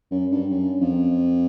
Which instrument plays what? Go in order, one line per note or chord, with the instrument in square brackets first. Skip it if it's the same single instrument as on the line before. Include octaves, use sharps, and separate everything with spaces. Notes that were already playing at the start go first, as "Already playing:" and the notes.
[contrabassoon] F#2
G2
F#2
F2